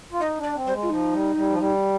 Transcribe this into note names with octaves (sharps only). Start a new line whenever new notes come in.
F4
D#4 D#5
D4
D5
C4
G3 C5
G#3
F4
F3 D#4
G3
G3
F3
G3